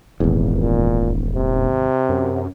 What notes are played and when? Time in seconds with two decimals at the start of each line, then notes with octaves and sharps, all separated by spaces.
0.20 D#1 G#1 E2
0.56 A#2
1.35 C3
2.09 F#2